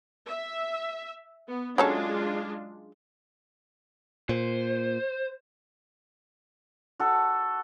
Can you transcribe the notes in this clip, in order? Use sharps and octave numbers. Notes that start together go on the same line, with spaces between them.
E5
B3
F#3 G#3 C#4 D4 F4 A4
A#2 C5
F#4 A4